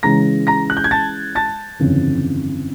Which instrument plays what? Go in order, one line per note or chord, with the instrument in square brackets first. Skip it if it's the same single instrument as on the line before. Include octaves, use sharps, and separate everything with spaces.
[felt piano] C#3 E3 G#3 [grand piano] A#5 A#6
[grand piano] A#5 A#6
F#6
G6
G#6
A5 A6
A5 A6
[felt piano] G1 F2 C#3 E3